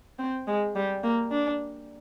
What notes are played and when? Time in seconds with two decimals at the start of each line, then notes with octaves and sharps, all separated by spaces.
0.19 C4
0.47 G#3
0.75 G3
1.03 A#3
1.31 D4